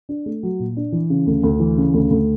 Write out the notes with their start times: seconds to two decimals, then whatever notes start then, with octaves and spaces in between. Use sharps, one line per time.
0.09 D4
0.26 A3
0.43 F#3
0.60 A#2
0.77 D4
0.92 E3
1.10 C#3
1.27 D2
1.43 D2
1.60 E3
1.78 C#3
1.94 D2
2.11 D2